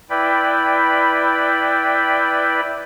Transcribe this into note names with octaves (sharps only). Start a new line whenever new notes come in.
E4 B4 D5 G5 B5